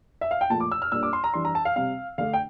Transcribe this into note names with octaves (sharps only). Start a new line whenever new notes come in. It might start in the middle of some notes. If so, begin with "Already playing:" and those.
E5
F5
G5
A#2 F3 A3 A5
D6
E6
F6
A#2 G3 A#3 D4 E6
D6
C6
A#5
E3 G3 D4 C6
A#5
A5
F5
C3 G3 C4 F5
D3 A3 D4 F5
G5